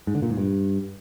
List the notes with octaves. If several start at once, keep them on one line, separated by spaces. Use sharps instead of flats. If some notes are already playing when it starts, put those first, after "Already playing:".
G#2
D3
A#2
G#2
G2